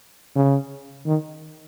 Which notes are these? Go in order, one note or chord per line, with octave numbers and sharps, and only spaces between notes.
C#3
D#3